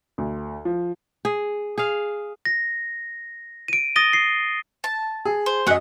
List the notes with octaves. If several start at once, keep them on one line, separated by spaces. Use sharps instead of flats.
D2
F3
G#4
G#4 F5
A#6
D7 D#7
D#6 A6 A#6 D#7 G7
C7
A5
G#4
C5
F#2 A3 G#4 D#5 F#5